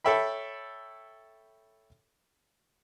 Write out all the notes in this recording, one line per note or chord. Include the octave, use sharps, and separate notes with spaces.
A4 C#5 E5 G5 B5